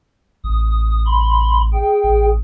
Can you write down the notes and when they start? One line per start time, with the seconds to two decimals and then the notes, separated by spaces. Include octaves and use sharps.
0.44 A1 D#6
1.06 B5 C6
1.73 G#4 G5
2.04 A1